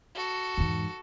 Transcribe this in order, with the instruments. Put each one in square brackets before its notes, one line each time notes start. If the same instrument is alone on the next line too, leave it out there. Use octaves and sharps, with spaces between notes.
[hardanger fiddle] F#4 A4
[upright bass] E2 G#2